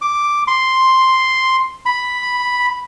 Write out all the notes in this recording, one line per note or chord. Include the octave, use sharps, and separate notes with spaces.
D6
C6
B5